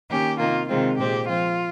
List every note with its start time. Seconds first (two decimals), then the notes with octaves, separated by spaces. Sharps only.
0.09 D#3 A#3 C#4 G4
0.39 C3 D#3 A#3 F4
0.69 C3 D#3 G#3 C4 F4
0.98 A#2 G#3 C4 G4
1.27 F3 C4 F4